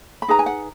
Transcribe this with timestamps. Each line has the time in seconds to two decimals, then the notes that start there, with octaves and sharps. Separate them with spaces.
0.22 B5
0.28 D#4 G#4 B4 A#5
0.39 G#5
0.46 F#5